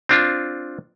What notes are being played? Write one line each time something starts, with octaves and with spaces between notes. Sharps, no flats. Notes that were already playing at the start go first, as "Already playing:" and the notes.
C4 D4 F4